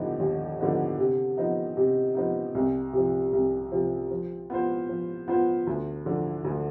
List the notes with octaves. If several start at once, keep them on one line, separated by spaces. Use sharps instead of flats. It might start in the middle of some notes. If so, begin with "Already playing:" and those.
Already playing: D#2 D3 F3 B3 D#4
D#2
D3 F3 B3 D#4
C3
F3 B3 D#4
C3
F3 B3 D#4
C2
C3 F3
C2
C3 F3
F3
B3 F4 C5
F3
B3 F4 C5
D2
D3 F3
D2